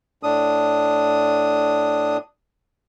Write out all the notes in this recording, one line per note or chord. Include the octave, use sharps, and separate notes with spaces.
A2 D4 D#6